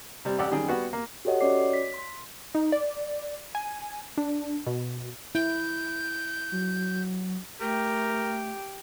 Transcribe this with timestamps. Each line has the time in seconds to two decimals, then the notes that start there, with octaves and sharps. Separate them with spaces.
0.25 C3 G3
0.38 A1 G4 D5 F#5 E6
0.51 F#2 D#3 G3 G#4 G5
0.68 G3 B3 F#4 F#5
0.93 A#3
1.25 F#4 G4 A4 C#5 D#5 F#5
1.41 C#4 F#4 C#5 D5 D6 C7
1.73 B6
1.94 C6
2.55 D#4
2.72 D5
3.55 G#5
4.17 D4
4.66 B2
5.35 E4 G6
6.52 F#3
7.61 A3 G4 A#4 G5